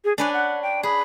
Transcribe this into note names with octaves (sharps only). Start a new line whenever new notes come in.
G#4
D4 B4 C#5 G#5
F#5
G5
G#4 B5